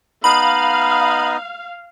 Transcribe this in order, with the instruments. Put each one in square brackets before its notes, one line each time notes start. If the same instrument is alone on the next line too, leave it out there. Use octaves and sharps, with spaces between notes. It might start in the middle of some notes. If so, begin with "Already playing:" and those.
[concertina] B3 D#4 D#5 [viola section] F5 [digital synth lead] B5